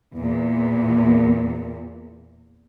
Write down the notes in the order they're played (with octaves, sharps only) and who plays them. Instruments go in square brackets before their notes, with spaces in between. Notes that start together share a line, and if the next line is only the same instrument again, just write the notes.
[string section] E2 A#2